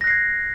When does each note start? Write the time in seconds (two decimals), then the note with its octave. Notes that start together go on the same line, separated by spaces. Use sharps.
0.01 A#6
0.04 F#6
0.07 C7
0.10 G#6